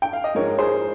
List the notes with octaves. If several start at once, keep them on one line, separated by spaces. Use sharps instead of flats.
G5
F5
D#5
G#2 F3 G#3 A#4 C#5
G#4 C5